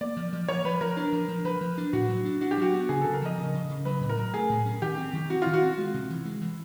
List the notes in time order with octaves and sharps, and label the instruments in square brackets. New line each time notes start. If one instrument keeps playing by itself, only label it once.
[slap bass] A#3 [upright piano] D5
[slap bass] F3
F3
[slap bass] F3 [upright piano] C#5
[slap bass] F3 [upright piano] B4
[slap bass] F3 [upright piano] A#4
[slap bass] D4
F3
F3
[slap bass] F3 [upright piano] B4
[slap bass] F3
D4
[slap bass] A2 [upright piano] F#4
[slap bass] F#3
D4
[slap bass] D4 [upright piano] F#4
[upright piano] G4
[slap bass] F#3 [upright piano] F#4
[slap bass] B3
[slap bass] C#3 [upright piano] G#4
[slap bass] C#3 [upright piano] A4
[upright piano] A#4
[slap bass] F3 [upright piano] D#5
[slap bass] C#3
C#3
C#3
[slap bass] F#3 [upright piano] B4
[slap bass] A2
[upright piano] A#4
[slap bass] F#3
[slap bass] A3 [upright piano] G#4
[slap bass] A2
C#4
[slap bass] D#3 [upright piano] G4
[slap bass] C4
D#3
[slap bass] C4 [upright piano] F#4
[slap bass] D#3 [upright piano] F4
[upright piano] F#4
[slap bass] C4
G#3
C3
E3
G#3
E3